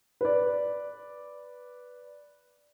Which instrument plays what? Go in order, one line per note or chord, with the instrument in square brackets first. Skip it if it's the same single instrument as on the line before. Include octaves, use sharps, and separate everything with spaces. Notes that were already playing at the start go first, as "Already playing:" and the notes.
[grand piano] B4 D5